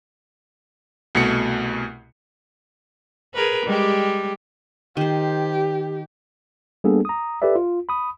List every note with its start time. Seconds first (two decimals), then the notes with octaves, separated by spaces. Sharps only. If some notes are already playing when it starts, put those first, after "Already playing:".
1.15 C2 B2 A3 C#7
3.34 G#4 A#4 B4
3.66 G3 G#3 G4
4.97 D#3 G4 C5
6.84 G3 A#3 B3 D4 G#4 A4
7.05 A#5 D#6
7.42 G4 A4 B4 D5 E5
7.56 F4
7.89 B5 D#6